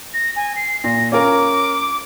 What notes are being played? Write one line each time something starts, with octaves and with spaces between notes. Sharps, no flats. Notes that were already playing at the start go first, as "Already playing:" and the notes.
A#6
G#5
C7
A#2 A#6
C#4 F4 A#4 D6